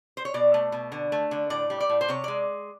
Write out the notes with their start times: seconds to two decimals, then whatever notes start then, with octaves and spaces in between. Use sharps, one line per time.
0.17 C5
0.25 C#5
0.34 B2 D5
0.54 A3
0.72 B2
0.92 D3
1.12 A3
1.31 D3
1.50 A2 D5
1.70 G3
1.80 D5
1.90 A2
2.01 C5
2.09 C3 C#5
2.24 G#3 D5